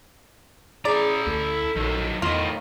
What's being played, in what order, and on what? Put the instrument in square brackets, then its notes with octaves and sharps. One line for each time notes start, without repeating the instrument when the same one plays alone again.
[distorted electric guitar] E4 A#5 [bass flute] G#4 [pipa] D5
[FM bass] D2 [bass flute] A4
[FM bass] A#1 [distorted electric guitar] D#3 F#3
[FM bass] E2 [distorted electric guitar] A2 D#5 [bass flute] D#3 [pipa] F4